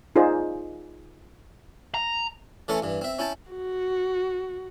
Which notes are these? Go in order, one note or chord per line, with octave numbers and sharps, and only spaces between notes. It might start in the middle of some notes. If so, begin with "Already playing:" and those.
D#4 F4 G#4 C5 D5
A#5
E3 A3 C#4 A4 C6 C#6
G2 E3
C4 E5
C#4 E4 G5 A5
F#4